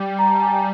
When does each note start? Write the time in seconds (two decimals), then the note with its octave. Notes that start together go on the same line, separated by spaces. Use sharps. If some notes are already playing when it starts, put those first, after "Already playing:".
Already playing: G3 G5
0.19 A#5
0.30 A5
0.41 G#5
0.53 G5